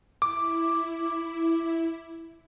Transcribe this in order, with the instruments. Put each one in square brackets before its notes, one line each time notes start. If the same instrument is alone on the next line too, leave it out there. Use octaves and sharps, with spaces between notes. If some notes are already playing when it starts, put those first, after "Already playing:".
[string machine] E4 [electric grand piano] D6